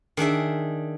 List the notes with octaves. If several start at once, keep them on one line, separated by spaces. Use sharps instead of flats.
D#3 D4 G#4 E5